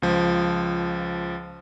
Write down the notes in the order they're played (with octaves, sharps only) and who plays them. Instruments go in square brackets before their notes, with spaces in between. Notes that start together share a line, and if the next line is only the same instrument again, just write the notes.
[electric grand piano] C#2 F3